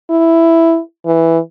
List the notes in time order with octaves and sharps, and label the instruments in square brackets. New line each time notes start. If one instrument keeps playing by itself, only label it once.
[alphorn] E4
E3